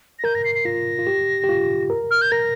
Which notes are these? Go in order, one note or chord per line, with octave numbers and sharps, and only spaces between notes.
A#6
A#4 G6
A#6
C7
C7
F4 A#6
F4
G4
G4
F4
A#4
F6
G6
A#4 A#6